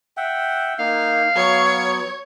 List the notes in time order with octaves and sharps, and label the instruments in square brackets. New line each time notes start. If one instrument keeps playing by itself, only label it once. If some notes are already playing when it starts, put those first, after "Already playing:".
[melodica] E5 F#5 G5
[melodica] A#3 D#4 [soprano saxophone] F5
[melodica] F#3 B3 [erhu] C#5